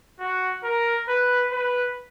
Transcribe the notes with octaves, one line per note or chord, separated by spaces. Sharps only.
F#4
A#4
B4
B4